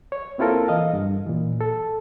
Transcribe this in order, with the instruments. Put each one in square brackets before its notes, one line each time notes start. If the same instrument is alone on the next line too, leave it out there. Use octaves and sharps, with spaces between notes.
[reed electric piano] C#5
A#3 C4 E4 F4 A4 A#4
E3 D#5 F5
G2
A#2 E3
A4